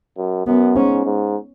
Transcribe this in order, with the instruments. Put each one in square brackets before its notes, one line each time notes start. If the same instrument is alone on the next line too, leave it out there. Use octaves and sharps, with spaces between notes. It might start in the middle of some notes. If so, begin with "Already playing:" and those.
[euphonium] F#2
[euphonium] F#2 [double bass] B3
[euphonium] G#2 [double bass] C#4
[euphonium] G#2